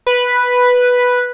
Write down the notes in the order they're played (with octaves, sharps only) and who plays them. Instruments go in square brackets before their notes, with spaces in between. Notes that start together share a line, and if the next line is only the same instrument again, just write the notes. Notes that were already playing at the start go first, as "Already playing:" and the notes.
[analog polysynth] B4